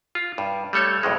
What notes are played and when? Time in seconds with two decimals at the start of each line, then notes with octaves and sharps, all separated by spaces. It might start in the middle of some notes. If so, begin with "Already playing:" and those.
0.15 F4
0.38 G2
0.73 G3 A3 A4 C#5
1.03 B1 F2 A2 G#3